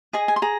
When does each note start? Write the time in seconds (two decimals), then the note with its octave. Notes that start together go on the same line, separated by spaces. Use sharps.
0.13 G#4 D#5 G#5
0.28 G#5
0.36 C6
0.42 G#4 A#5